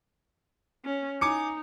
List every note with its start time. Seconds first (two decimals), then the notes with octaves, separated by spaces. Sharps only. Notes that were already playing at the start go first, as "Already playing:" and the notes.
0.85 C#4
1.21 D#4 G#5 D6 C#7